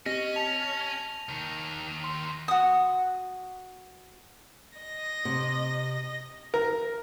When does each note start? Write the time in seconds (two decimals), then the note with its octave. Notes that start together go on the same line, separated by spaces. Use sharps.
0.06 C4 C#4 G4 D#5 A#6
0.36 A5 F7
1.29 D#2 D#3
2.04 C6
2.48 F#4 D#6
4.79 D#5 A#6
5.25 C3
6.54 A#4